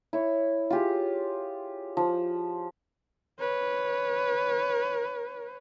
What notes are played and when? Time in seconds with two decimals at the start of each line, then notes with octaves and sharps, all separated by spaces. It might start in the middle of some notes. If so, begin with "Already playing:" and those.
0.13 E4 C#5
0.70 F4 G4 G#4
1.97 F3
3.40 B4 C#5